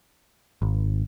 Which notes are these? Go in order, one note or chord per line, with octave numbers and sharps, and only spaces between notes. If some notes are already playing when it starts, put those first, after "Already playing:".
G#1